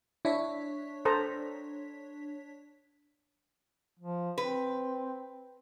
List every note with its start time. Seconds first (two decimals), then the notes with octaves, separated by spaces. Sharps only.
0.25 D4 E4 C#5 E5 B6
1.05 A4 C5 A#5
3.99 F3
4.38 C4 B4